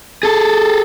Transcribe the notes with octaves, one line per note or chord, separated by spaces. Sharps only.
G#4 A4